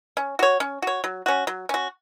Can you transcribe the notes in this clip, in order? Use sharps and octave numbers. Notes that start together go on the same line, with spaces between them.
C#4
F#4 C#5
C#4
F#4 C#5
F#3
C#4 F#4
F#3
C#4 F#4